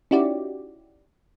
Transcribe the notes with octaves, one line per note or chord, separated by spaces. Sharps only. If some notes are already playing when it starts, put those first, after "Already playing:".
C#4 D#4 E4 F#4 G4 D5